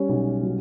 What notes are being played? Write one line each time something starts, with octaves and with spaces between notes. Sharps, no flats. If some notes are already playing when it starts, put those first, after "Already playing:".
Already playing: G3 C#4 C#5
B1
F#3